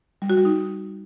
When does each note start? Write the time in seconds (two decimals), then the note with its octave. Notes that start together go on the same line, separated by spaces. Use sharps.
0.22 G3
0.30 F#4
0.37 G3
0.45 D#4